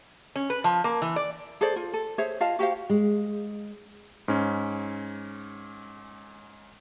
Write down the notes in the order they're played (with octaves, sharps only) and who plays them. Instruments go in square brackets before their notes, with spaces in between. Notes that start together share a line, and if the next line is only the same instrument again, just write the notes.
[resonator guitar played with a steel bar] C#4
B4
F3
A#3
E3
D5
[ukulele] G#4 A4 C5 D5
F4
A4
G#4 C5 C#5 E5
F4 D#5 F5 A5
F#4 G4 C5 F5
[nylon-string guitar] G#3
[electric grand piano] G#2 C#4